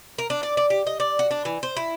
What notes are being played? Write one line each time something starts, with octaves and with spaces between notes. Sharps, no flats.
A#4
D4
D5
D5
G4
D#5
D5
F#4
D4
E3
C5
E4